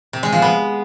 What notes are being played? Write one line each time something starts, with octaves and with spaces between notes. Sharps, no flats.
C3
G#3
F3
B3